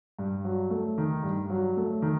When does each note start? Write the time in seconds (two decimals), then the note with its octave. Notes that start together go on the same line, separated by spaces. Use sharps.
0.19 G2
0.44 F#3
0.70 A3
0.98 D#3
1.23 G2
1.50 F#3
1.77 A3
2.02 D#3